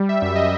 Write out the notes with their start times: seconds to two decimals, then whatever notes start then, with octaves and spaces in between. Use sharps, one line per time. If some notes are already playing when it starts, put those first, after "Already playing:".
Already playing: G3
0.09 E5
0.22 F#2 E5
0.36 D#5